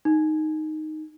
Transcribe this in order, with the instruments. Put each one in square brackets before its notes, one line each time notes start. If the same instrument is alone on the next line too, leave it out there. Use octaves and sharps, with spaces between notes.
[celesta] D#4